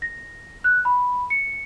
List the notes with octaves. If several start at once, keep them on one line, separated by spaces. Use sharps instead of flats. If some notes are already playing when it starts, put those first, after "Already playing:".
A#6
F#6
B5
C#7